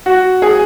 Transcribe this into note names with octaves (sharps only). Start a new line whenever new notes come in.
F#4
G#4